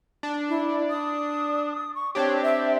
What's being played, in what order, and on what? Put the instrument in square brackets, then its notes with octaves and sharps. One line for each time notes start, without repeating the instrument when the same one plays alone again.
[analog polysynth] D4
[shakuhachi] E4
D#6
C#6
[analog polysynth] C4 D4 G4 [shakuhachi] C#5
[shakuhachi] E5